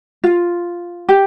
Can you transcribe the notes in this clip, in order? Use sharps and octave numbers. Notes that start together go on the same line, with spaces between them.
F4
G4